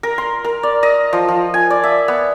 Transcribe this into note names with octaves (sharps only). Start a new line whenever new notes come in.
A#4
C6
A#4
D5
D#5
F3
F3
G#5
D5
E5
B3